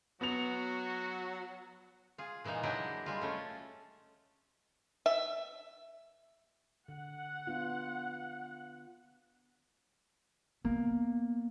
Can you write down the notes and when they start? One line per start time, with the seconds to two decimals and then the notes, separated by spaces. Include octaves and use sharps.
0.21 F#3 B3 F#4 F7
2.18 F4 G#4
2.44 A#2 E3 G#3 A#3 D#4
2.63 F#3 G#3 D4 E4 G4 D#5
3.06 G3 G#3 F4
3.21 A3 C#4
5.06 E5
6.88 D3 F#5
7.47 B3 D4 F4
10.65 A#3 B3